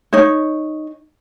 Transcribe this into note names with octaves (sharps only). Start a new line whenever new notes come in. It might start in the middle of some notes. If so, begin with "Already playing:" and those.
D#4 C#5